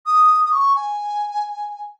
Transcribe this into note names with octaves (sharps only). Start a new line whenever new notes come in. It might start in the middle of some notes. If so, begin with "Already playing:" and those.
D#6
D#6
C#6
G#5